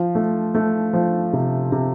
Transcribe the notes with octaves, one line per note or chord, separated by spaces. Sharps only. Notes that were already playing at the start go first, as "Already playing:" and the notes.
Already playing: F3
A3
A3
F3
C3
C3